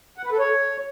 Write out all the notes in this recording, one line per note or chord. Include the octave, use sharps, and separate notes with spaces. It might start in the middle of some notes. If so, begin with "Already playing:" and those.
F#5
B4
A4
C#5